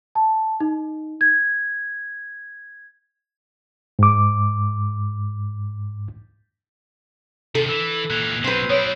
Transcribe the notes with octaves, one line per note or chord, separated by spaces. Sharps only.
A5
D#4
G#6
G#2 D6
C3 D#3 A4
E3 E6
A#2 E3 F#6 G#6 F7
B2 F#3 C4 B4 G6 C7
F#3 B3 C#5 D#6 D7